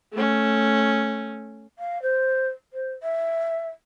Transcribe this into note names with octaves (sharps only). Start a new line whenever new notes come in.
A3 C#4
F5
C5
C5
E5